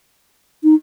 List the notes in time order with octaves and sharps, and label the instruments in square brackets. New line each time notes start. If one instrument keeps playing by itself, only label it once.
[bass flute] D#4